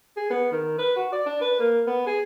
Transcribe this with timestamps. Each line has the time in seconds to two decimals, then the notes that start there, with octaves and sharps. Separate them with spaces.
0.17 G#4
0.30 B3
0.52 D#3
0.78 B4
0.96 F#4
1.12 D5
1.26 D4
1.41 B4
1.59 A#3
1.87 B3
2.07 G#4